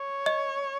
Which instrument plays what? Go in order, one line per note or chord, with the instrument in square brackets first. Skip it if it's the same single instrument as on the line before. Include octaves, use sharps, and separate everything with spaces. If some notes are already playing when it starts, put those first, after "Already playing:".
Already playing: [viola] C#5
[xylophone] D#5